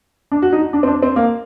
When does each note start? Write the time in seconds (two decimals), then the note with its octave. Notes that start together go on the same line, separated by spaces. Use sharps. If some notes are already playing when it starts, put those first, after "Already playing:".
0.32 D4
0.42 F#4
0.53 D#4
0.73 D4
0.83 C4
0.87 D4
1.02 C4
1.16 A#3